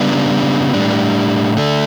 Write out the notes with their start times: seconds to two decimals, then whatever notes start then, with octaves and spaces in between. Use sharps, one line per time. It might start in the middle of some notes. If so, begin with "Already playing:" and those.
Already playing: C#3 G3 B3 D4
0.74 A2 G3 D4
1.57 D3 A3 D4